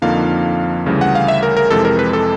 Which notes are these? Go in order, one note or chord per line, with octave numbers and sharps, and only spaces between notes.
F2 D3 F3 A#3 D#4 F5
D2 C#3 E3 G3
F#5
F5
E5
A#4
A#4
F2 C3 E3 G#3 A4
A#4
B4
A4